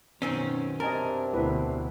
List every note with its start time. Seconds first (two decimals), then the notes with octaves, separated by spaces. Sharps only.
0.22 F#2 B2 D#3 C4 C#4
0.80 C3 C4 D4 A#4 D#5 G#5 A5
1.34 D2 B2 E4 B4